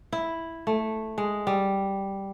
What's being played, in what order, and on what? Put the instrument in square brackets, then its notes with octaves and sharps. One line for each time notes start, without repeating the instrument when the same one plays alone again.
[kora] E4
A3
G#3
G3